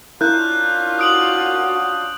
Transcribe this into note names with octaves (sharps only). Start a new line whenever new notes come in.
C#4 D4 E4 F4 A#4 F#6 G6
F#4 D#6 D7 F#7